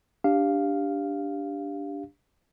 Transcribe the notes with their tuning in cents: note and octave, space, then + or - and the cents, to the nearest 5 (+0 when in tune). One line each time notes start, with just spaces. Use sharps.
D4 -10 G4 +10 F5 +0